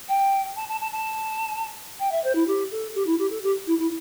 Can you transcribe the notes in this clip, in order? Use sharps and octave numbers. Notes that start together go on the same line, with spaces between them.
G5
A5
A5
A5
A5
G5
E5
C5
E4
G4
A4
G4
E4
G4
A4
G4
E4
E4